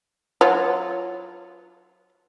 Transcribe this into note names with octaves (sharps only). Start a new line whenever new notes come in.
F#3 F4 C5